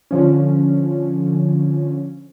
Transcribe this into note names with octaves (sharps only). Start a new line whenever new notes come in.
D3 F3 C#4